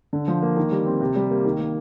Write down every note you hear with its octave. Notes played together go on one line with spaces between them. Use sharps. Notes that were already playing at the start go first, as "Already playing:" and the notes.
D3
F3
A#3
D#3
G3
C4
C3
G3
A#3
D#3
A#3